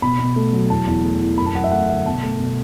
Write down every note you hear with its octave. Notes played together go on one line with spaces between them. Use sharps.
B2 B5
B2
A3
F#3
E2 A5
E2
A3
E3
F#2 B5
A5
F#2 F#5
E5
A3 F#5
D3 E5
B2 A5
A3
B2